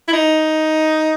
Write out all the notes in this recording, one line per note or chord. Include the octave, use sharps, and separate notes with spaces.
E4
D#4